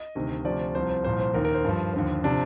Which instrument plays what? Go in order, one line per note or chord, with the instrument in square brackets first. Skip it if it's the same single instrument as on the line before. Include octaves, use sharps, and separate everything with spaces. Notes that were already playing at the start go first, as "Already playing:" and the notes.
Already playing: [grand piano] D#5
D2 C3 D#3
D2 C3 F3 D5
C2 C3 F3 C5
C5
C2 A#2 F3 C5
C5
D#2 D#3 A#4
A#4
C5
G2 F3
D#2 D3 F3
C3 F3 D4